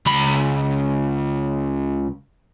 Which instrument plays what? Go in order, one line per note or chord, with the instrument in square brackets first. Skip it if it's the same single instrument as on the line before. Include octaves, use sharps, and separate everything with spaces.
[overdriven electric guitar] C#2 B5